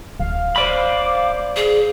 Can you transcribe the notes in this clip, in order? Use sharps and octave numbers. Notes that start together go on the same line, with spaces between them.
D1 F5
C5 D5 B5 D6
G#4